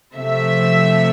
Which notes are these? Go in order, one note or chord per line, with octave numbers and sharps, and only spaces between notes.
C3 F3 A3 E5